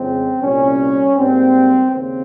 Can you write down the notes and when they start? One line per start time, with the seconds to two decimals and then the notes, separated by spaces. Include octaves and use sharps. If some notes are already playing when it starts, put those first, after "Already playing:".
Already playing: F2 C#3 F3 G#3 C4
0.42 C2 A#2 G3 C#4
1.17 G#2 G3 A#3 C4
1.92 D#2 C#3 A#3 C4